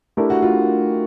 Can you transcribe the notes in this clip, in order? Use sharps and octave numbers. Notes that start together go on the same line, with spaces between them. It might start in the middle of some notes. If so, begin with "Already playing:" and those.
A3 D4 E4 G4 A#4
F#4
F4